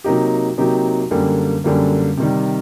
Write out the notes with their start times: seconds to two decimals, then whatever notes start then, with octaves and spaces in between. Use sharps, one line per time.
0.04 C3 F#3 A#3 D#4 G4
0.58 C3 F#3 A#3 D#4 G4
1.11 F#2 D3 G3 A#3
1.64 F#2 D3 G3 A#3
2.18 C3 D#3 G3